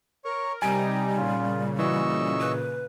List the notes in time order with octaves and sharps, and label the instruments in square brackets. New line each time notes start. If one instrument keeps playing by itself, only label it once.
[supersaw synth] A#4 [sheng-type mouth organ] C#5 C#6
[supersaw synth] C3 D#4 G4 [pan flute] G3 [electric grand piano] G#5 D7 [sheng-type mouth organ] A#5
[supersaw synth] A#2 C#3 [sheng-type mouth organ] F4
[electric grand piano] E3 F#4 [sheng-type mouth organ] D#5 C#6 E6
[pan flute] B4